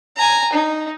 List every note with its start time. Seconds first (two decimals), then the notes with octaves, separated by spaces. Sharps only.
0.17 G#5 A#5
0.53 D#4